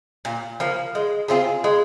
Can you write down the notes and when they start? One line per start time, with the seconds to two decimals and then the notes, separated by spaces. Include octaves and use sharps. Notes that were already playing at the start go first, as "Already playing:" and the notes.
0.25 A#2
0.60 F3 A#3
0.95 G#3
1.28 C4 F4 G#4
1.64 G#3